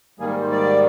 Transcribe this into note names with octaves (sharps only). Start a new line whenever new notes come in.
G#2 D#3 G3 A#3 G#4
A#4
C5
D5